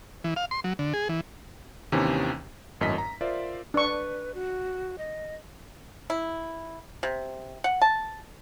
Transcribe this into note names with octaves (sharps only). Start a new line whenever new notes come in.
E3
F5
C6
F#3
D3
G#4
E3
D#2 C3 D#3 E3 C#4
G#1 F#2 A2 D#5 A5 B6
A#5
F4 A#4 C5 D5 E5
D4 B4 C#6
F#4
D#5
E4
C3
F#5
A5